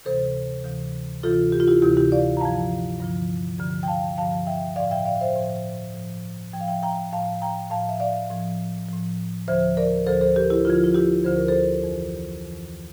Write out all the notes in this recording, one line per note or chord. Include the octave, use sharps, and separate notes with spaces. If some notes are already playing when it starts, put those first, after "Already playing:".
D2 C3 E3 A4 C5
D2 C3 E3
D2 C3 E3 F4 A4
G4
F4
E4 G4
D2 C3 E3 E4 G4
E4 G4
D5 F5
A#5
G2 D3 F3 F5 A5
G2 D3 F3
G2 D3 F3
G5
F5 A5
G2 D3 F3 F5 A5
E5 G5
A2 F3 D5 F5
E5 G5
D5 F5
C5 E5
A2 F3
A2 F3
A2 F3 G5
F5
E5 G5
G5 A#5
A2 F3 F5 A5
G5 A#5
A2 F3 F5 A5
E5
D5 F5
A2 F3
A2 F3
D2 D3 F3 C5 E5
A#4 D5
D2 D3 F3 A4 C5
A4 C5
G4 A#4
E4 G4
D2 D3 F3 F4
E4
F4
E4 G4
D2 D3 F3 C5
A#4
A4 C5
F2 E3
F2 E3